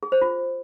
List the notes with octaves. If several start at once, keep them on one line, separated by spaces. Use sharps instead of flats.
G#4
C5
F4